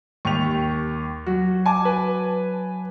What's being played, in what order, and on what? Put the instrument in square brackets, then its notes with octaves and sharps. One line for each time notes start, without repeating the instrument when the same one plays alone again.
[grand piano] D#2 G4 F7 [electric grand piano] C#6
[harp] F#3 [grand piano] F#4
[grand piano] G#5 A5 D6
[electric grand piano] B4